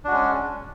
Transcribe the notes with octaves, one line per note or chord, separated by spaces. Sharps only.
G#3 C#4 D4 F#4